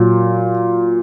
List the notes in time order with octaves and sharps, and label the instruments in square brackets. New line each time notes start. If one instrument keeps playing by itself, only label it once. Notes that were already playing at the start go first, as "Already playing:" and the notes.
Already playing: [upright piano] A#2 F#3